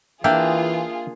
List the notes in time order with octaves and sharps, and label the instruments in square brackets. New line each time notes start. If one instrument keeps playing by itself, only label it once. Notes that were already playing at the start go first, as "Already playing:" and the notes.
[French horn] E3 [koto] A#3 D4 [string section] F4 G#4 [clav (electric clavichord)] E5 G5